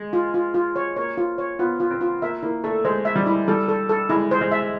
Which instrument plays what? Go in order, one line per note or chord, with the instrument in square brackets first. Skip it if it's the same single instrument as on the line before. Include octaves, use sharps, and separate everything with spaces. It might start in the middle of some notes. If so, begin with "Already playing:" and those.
Already playing: [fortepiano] G#3
[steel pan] F4
F4
F4
C#5
[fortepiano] A#3 [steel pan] C#5
[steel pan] F4
C#5
[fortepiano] B3 [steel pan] F4
[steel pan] F4
[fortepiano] C4
[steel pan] F4
[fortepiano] A#3 [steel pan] E5
[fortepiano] A#3 [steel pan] E4
[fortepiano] A3 [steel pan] A4
[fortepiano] G#3 [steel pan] C5
[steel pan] E5
[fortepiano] G3
[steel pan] E4
[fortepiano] G3 [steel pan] A4
[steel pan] A4
A4
[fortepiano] G#3 [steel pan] E4
[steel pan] C5
[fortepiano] G#3
[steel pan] E5